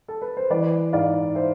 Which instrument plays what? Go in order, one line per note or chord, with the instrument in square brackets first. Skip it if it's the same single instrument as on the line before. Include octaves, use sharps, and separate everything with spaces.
[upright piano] A4
B4
C5
E3 B4 D5
G#2 D5 F5
C5 E5